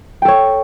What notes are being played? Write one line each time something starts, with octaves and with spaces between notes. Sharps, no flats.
A4 C#5 G5